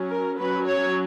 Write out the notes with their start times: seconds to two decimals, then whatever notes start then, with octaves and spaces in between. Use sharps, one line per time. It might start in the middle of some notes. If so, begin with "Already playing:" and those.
Already playing: F#3 C#4
0.10 A#4
0.38 F#3 C#4 B4
0.66 C#5